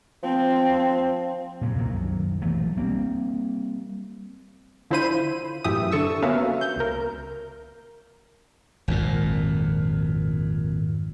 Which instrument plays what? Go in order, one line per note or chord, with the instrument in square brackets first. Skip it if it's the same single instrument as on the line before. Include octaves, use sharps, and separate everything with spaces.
[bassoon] F3 [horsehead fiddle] C4
[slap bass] A#2 C#3 F3 F#3
C2 F#2 D#3 F#3
B1 E3 F#3 A3
G3 A#3 C4
[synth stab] D3 E4 F4 C5 B5 D#7
F#2 A2 E3 G4 E5 D#6
D3 A4 C#6 E6
A#3 B3 C#4 F#4 E5 F5
G6
C#2 A#4
[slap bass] G#1 F2 A#2